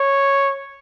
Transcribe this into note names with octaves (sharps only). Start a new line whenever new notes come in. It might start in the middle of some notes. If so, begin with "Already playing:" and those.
Already playing: C#5